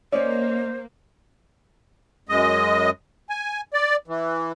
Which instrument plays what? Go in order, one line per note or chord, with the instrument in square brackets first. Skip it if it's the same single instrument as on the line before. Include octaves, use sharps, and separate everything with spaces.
[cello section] A#3 [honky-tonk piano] C#4 [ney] C5 [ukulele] D5 D#5
[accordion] F#2 G#3 D#5
G#5
D5
E3